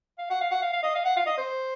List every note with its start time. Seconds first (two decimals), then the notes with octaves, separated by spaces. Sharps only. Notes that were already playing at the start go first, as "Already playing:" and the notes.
0.18 F5
0.30 F#5
0.41 F5
0.51 F#5
0.62 F5
0.73 F5
0.83 D#5
0.95 F5
1.05 F#5
1.16 F5
1.26 D#5
1.38 C5